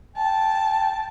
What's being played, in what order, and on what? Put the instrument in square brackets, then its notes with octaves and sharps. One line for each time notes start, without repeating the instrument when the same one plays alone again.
[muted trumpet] G5 [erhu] A5